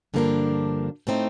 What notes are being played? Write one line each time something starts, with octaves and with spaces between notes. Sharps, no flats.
G2 D3 F3 A#3 D4
A2 A3 C4 D#4